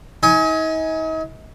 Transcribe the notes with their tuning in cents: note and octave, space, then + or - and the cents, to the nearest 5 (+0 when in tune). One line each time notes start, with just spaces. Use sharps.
D#4 +40 G#5 +5